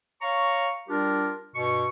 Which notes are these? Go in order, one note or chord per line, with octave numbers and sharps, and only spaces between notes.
C#5 F5 A#5 C#6
G3 D4 F4 G4 A#4
G2 B2 C#6